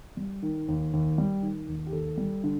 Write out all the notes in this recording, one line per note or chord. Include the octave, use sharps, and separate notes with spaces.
G3
D#3
D#2
D#2
G3
D#3
D#2
G4
D#2 A4
G3
D3